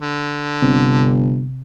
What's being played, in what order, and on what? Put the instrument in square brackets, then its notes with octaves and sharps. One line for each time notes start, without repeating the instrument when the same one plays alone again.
[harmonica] D3
[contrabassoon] G1 [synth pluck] C3